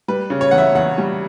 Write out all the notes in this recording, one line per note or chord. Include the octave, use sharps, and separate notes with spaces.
G3 B4
C#3
C#5
E2 F#5
E5
E2 F#5
G3